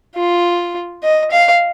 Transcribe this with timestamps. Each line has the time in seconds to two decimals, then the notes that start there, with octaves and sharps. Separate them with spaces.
0.16 F4
1.03 D#5
1.31 F5